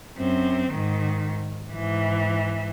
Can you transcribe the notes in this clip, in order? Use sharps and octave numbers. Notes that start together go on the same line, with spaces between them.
F#2 C4
G#2 D#3
G#2 E3